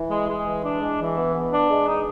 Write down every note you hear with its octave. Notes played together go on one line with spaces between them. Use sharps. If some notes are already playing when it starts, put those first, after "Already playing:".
Already playing: E3
G#3
G#3
E3
D4
G#3
E3
B3
B3
D4
G#3
D#4